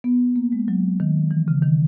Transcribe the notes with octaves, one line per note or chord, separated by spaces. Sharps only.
B3
A#3
G#3
F#3
D#3
E3
C#3
D#3